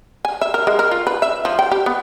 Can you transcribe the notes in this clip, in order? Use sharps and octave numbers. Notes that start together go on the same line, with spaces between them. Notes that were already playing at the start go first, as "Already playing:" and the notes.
G#5
E5
A#4
G#3
A#4
F4
B4
E5
F3
G5
G4
B3